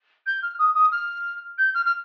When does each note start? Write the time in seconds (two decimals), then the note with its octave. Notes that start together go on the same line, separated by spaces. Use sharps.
0.26 G6
0.42 F6
0.59 D#6
0.75 D#6
0.92 F6
1.58 G6
1.74 F6
1.86 F6